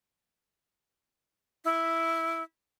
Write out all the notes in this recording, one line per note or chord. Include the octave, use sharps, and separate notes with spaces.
E4